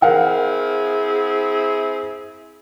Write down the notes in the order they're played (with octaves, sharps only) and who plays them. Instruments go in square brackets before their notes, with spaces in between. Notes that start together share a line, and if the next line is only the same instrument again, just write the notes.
[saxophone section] C4 E4 G#4 [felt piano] A#4 F5 F#5